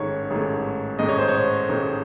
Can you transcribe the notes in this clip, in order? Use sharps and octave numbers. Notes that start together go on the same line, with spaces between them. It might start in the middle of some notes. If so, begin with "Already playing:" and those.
Already playing: A1 G#2 D#3 A3 C#5
A1 G#2 D#3 A3
A1 G#2 D#3 A3 D#5
C#5
C5
C#5
A1 G#2 D#3 A3